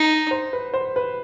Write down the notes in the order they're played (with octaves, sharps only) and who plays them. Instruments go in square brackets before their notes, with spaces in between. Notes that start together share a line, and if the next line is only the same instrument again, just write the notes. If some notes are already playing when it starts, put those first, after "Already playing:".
Already playing: [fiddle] D#4
[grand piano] C5
B4
C5
B4